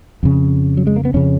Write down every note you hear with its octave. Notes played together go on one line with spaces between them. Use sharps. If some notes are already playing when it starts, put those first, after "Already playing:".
F2 C#3
F#3
G#3
A#3
B3
F2 C#3 C#4